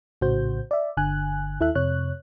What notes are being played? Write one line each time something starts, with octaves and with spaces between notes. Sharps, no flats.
A#1 A2 C#3 F#4 C5 G6
D5 E5
G1 D3 G#5 F#6
D#2 E4 A4 E5 F#6
F2 C3 C#5 F#6